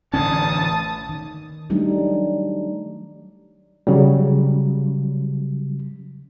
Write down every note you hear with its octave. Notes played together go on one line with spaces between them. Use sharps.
A1 D3 C#4 A5 D#6
D#3
F#3 G3 A3 D4 D#4
C#3 F#3 G3